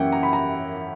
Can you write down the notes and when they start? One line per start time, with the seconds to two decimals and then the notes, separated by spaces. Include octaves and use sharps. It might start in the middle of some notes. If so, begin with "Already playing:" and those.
Already playing: F#2 E3 A#3 C#4 E4 F#5 G5
0.12 A#5
0.23 B5
0.33 A#5